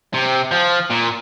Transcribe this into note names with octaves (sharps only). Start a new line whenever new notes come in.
C3
F3
A#2